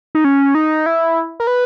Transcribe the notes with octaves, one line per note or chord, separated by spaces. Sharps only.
D#4
C#4
D#4
E4
A#4
B4